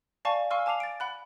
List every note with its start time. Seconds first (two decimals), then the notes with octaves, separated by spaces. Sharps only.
0.25 D5 F5 G#5 A5 C#6
0.50 F5 G#5 C6 C#6 E6 F6
0.66 G#5 A5 D6 C7 F7
0.80 A6 D7
1.00 F#5 B5 F#6